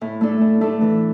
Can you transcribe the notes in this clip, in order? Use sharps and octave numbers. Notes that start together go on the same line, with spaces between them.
A2
A3 D4 A4
A2
A3 D4 A4
E3